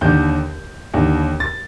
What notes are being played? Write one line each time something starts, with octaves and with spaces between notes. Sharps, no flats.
D#2 D3 G6
D#2 D3
A6